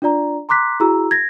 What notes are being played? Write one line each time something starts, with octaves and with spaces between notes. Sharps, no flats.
D4 F4 D5 A#5
A#5 C6 D6 F#6 B6
E4 F#4 G#4 A#5 E6
G#6 A#6